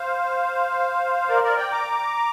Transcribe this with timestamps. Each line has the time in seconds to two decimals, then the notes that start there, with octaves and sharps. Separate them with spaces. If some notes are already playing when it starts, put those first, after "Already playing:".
Already playing: C5 F5
1.29 A#4 D5
1.43 A#4 D5
1.57 D5 G5
1.72 A#5 D6